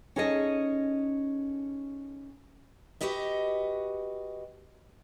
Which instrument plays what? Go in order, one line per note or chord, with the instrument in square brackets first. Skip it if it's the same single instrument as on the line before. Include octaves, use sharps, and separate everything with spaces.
[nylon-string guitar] C#4 D#4 G#4 A4 D#5
[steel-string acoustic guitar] F#4 G4 B4 D#5 E5